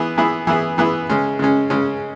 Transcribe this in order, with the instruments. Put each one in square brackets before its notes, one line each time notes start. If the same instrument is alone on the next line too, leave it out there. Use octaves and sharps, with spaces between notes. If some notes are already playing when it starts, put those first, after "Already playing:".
Already playing: [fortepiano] E3 B3 E4 G#4
E3 B3 E4 G#4
E3 B3 E4 G#4
E3 B3 E4 G#4
C#3 G#3 C#4
C#3 G#3 C#4
C#3 G#3 C#4